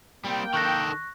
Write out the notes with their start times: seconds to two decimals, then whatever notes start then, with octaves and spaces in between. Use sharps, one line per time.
0.24 G3 A#3 C4 G5
0.54 D#3 A4 C#6 F#6 A#6